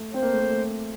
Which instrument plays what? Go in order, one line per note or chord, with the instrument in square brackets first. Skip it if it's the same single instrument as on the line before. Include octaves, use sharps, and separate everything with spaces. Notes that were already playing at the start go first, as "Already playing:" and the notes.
Already playing: [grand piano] A3
[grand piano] C4 [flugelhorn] C5
[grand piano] A#3
A3
A#3
A3